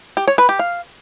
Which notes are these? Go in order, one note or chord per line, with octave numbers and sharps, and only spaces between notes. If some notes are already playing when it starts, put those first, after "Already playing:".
G4
C#5
B4
G4
F5